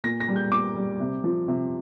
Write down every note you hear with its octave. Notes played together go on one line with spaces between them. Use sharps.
A#2 A#6
A#6
G3
G6
A#2 D6
G3
C3
F3
C3